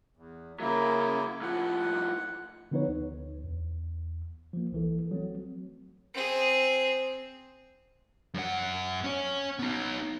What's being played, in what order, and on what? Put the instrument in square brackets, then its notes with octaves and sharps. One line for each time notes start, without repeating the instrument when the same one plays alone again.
[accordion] E2
[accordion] C#3 A#3 E4 [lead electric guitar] F#3 A#4
[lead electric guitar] A2 F3 [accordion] F#5
[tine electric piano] D3 F3 B3 D#4 B4 C#5
D2
E2
F3 A#3
B1 E3 A4
F#3 A3 C4
[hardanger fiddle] C4 G#4
[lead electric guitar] F#2 F#5
C#4 C#5
B3 D#4